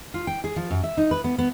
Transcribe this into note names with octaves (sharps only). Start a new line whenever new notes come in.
F4
G5
G#4
F3
F#2
E5
D#4
B4
B3
B3